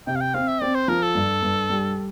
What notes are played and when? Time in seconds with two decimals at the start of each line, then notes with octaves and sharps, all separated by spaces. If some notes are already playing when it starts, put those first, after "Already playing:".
0.07 C3 G5
0.16 F5
0.21 G5
0.34 C4 F5
0.48 E5
0.62 C4 D5
0.75 C5
0.88 F3 A#4
1.02 A4
1.15 G2
1.42 G2
1.69 G3